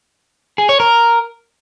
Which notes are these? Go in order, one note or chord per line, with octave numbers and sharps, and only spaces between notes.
G#4
C#5
A#4